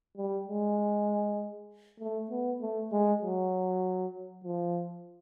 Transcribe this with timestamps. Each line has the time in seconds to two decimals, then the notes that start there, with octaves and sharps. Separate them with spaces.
0.17 G3
0.48 G#3
2.00 A3
2.31 B3
2.61 A3
2.92 G#3
3.22 F#3
4.44 F3